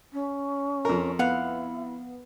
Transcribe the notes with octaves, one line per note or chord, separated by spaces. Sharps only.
C#4
F2 A#4
B3 E4 F5 F#5